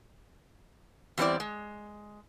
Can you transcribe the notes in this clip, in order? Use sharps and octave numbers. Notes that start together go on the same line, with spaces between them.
E2 F#3 G3 C4 E4 D5
G#3